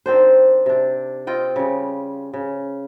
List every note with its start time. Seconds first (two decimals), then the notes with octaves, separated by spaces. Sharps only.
0.06 D#3 C4 D4 C5
0.66 C3 D4
1.27 C4 F4 D#5 G5
1.56 C#3 G3
2.34 C#3